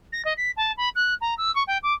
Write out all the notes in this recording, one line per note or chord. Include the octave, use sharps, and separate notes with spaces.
A#6
D#5
B6
A5
B5
F#6
A#5
E6
C#6
G5
D6